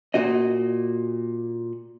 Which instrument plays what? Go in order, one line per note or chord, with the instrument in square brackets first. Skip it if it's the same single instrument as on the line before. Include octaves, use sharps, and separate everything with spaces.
[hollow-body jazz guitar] A#2 F#4 D#5